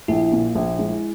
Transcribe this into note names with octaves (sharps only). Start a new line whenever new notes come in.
A#1 E4
A#2
A#1
G#3